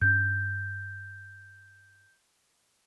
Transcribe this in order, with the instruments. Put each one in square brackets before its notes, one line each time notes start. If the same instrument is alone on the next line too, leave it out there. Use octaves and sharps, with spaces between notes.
[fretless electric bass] G2 C#4 [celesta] G6